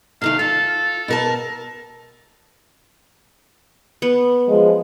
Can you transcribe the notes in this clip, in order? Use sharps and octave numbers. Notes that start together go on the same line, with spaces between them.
C3 D#3 A3 F5
F4 A4
B2 A#4 A5
B3
F3 G#3